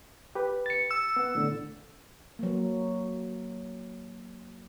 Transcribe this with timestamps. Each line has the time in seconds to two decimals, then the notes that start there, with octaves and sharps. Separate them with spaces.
0.35 G4 B4
0.66 A6 C#7
0.91 E6
1.16 B3 F#5
1.35 A2 D3
2.39 F#3 A#3